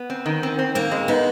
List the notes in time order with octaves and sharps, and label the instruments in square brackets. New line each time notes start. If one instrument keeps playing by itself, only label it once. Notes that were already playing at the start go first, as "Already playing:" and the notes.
Already playing: [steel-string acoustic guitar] B3
[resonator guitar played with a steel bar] C4
D#3
C4
C4
[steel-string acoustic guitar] A#3 [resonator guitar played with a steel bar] C4
[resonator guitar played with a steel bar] G#3
[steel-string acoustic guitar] B3 [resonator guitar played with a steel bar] D#4